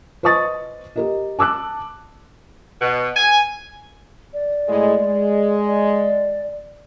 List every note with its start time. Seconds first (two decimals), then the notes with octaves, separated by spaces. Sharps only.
0.23 B4 C5 D#5 C#6 D#6 A6
0.96 G4 A#4 D#5
1.39 A5 D6 E6 F#6
2.81 B2
3.15 G#5
4.33 D5
4.67 A2 G#3
4.98 G#3
5.67 D5